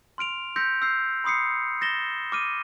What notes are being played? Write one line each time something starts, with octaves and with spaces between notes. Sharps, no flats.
C6 F6 D7 F7
C6 E6 G6 A#6 B6 C#7
E6 F6 G6 C7
B5 C6 D#6 C7 C#7
A6 A#6 E7 G7
D6 F6 D#7